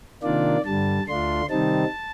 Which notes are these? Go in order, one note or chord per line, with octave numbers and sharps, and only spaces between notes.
C3 D#3 A#3 D4 F4 D5
G2 D3 G3 A5
D2 D3 A3 D4 F4 C6
C3 D#3 G3 C4 D#4 A5